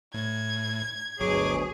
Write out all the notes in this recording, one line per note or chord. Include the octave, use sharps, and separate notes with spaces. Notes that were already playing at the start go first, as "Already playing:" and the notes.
A2 G#6
G1 D2 B2 F#3 G#4 C#5 D6